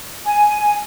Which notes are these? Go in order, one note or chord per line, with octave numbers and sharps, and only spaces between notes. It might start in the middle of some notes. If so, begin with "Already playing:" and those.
G#5